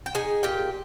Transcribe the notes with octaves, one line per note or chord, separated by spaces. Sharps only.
G5
D#4 G#4 G#5
A#2 G4 G5